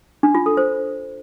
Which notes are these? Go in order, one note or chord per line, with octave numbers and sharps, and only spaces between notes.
D4
F4
A4
C5